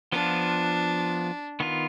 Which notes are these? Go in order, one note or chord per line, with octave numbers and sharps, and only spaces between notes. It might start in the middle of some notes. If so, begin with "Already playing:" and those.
F3 B3 D4 F4
D#3 B3 F4